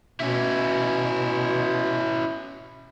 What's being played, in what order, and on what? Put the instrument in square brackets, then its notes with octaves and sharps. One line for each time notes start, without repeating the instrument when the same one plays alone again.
[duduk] B2 [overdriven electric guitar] C#4 E4